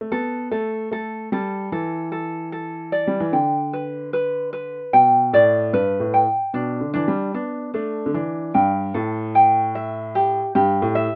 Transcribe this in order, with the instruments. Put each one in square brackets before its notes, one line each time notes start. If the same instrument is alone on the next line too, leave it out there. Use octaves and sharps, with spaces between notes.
[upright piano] A3
[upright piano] B3 [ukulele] A4
[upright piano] A3 [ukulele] A4
[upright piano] A3 [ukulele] A4
[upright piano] G3 [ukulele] A4
[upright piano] E3 [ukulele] A4
[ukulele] A4
A4
D5
[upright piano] G3
E3
[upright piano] D3 [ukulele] G5
[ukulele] B4
B4
B4
[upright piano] B2 [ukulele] G5
[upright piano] A2 [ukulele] D5
[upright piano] G2 [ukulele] B4
[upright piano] A2
[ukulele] G5
[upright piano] B2 [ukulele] D4
[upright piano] D3
[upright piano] E3 [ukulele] D4
[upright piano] G3
[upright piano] B3 [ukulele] D4
[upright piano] A3 [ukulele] D4
[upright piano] D3
[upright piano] E3 [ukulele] D4
[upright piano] G2 [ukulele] G5
[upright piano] A2 [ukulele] A4
[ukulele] G5
E5
G4
[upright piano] G2 [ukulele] G4
[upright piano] A2
[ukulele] E5